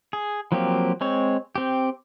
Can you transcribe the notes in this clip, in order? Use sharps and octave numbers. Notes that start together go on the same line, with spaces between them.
G#4
F3 F#3 A#3 C4 G4
G#3 C4 C#5
C4 G4